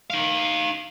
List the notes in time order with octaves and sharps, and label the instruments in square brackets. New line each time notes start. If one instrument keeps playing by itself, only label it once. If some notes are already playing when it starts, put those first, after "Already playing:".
[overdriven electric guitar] D#4 F5